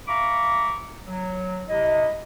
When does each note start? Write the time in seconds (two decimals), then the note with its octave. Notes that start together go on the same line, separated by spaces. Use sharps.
0.08 E5 F5 A#5 B5 C#6 D6
1.07 F#3
1.68 C3 E4 D#5